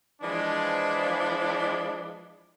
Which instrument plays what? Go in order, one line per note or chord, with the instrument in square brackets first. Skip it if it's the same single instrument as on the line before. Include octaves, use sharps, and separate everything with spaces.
[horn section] E3 F3 G#3 D4 D5